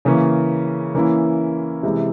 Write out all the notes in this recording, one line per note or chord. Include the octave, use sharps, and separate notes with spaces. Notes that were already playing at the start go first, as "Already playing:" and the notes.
C#3 E3 A#3 C#4
E3 A#3 C#4 E4
C3 E3 G#3 E4